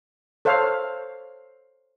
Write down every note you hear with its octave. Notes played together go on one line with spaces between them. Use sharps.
A4 C5 C#5 F5